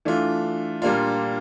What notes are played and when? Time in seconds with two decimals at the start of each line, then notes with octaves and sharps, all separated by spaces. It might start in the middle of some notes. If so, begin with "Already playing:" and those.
0.05 E3 A3 D4 F4
0.82 A#2 G3 A#3 D4 F4